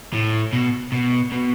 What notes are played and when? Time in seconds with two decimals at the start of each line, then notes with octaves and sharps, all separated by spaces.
0.13 A2
0.53 B2
0.92 B2
1.32 B2